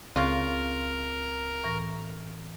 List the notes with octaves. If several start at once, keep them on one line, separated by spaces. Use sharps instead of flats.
C#2 C#3 C4 F4 A#4
A2 E3 A#6